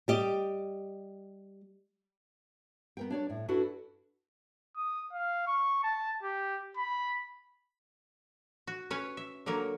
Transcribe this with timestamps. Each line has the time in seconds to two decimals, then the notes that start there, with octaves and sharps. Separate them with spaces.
0.08 G3 G4 D#5
2.97 B3 A#4 G5
3.11 D4 C#5 D5
3.30 A2
3.48 D4 E4 F#4 A4 B4
4.77 D#6
5.13 F5
5.47 C#6
5.84 A5
6.23 G4
6.78 B5
8.67 F#4
8.91 C#4 B4 C#5
9.17 E5
9.46 D3 F#3 A#3 A#4 C#5